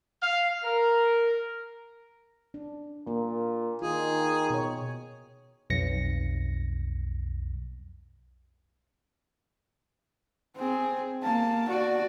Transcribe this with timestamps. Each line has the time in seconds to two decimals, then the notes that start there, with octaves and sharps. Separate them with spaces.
0.23 F5
0.64 A#4
2.54 D4
3.07 A#2 A#3
3.82 D#3 F4 G#4
4.50 B2 C#5
5.70 B1 F2 A#6 C#7
10.56 C4 G#4
11.23 A#3 A5
11.68 F#4 D5